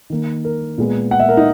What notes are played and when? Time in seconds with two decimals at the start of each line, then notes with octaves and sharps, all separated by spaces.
0.10 D#3 A#3
0.45 A#4
0.78 A#2 G#3 B3
1.11 F#5
1.19 E5
1.29 A#4
1.37 D#4